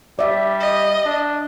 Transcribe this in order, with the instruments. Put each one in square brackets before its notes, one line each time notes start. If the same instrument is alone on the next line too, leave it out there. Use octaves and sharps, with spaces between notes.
[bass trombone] G3 [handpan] D5 E5
[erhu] D#5
[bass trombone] D4